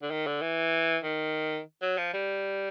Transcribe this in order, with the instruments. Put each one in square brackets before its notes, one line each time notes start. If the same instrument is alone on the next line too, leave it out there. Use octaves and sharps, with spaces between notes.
[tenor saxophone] D3
D#3
D3
E3
D#3
F#3
F3
G3